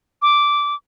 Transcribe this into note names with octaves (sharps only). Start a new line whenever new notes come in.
D6